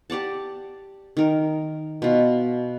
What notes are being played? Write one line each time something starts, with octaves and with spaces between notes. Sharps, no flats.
G4 D5 F#5 A5
D#3 A#4
B2 F4